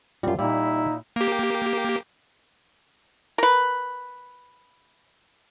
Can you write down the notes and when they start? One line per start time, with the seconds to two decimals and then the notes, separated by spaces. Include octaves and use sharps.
0.23 F#2 G3 F4 F#4
0.39 A#2 G3 D#4 E4
1.16 A#3 G4
3.38 A#4 B4